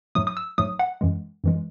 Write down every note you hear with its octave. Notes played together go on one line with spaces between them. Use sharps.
G#2 F#3 A3 D#6
D#6
E6
G#2 F#3 A3 D#6
F#5
F#2 E3 G#3
F#2 E3 G#3